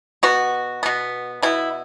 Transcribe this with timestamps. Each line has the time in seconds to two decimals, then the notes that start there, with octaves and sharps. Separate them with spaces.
0.23 B2 B3 F#4
0.83 B2 B3
1.42 B2 B3 E4